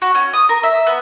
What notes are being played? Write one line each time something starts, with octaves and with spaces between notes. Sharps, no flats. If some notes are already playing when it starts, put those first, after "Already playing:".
F#4
C#4
D#6
A#4
E5
B3